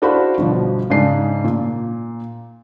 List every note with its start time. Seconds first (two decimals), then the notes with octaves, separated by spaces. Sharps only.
0.02 D4 E4 F#4 C5 F5 B5
0.38 G1 B2 F3
0.90 G#2 C#3 D4 D#4 C7
1.44 A#2